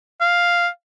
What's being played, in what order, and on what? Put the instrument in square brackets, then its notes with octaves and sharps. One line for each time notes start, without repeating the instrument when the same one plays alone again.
[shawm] F5